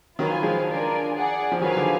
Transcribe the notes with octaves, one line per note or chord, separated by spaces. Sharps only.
D#3 F#3 F4 B4 F5 G#5
F3 G#3
D4 F4 A#4 D5 G#5
G#4 D5 F#5
F3
D#3 F#3 G#4 B4 F5 G#5
D3 F3